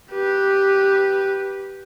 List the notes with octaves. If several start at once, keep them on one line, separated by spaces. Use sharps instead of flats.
G4 B4